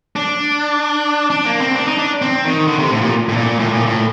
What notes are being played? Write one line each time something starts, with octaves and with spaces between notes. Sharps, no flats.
D4
D4
A#3
C4
D4
D#4
D4
C4
D#3
D3
C3
A2
A#2
A2
A#2
A2
A#2
A2